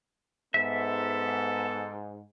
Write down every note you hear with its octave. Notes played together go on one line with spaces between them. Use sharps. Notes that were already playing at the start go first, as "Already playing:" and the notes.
G#2 B3 A4 E5